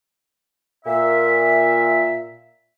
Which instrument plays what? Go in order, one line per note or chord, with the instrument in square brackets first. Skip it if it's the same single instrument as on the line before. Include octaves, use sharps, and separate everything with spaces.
[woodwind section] A#2 E5